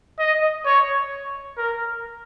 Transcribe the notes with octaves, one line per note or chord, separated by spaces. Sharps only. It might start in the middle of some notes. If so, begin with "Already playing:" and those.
D#5
C#5
A#4